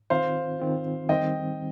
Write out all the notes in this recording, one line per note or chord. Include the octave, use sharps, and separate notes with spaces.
D#3 C4 F4 C5 F5
D#3 C4 F4
D#3 G3 C4 D#5 G5